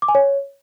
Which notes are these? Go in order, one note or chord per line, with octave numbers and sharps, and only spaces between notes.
D6
G#5
C#5